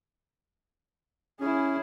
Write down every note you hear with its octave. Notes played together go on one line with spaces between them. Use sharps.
C#4 E4 G#4